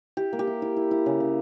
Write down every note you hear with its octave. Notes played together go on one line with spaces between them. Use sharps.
E4 G4
A#3
G4
E4
E4
E4
E4
C#3
C#3